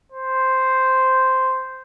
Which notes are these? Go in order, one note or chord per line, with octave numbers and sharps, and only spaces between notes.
C5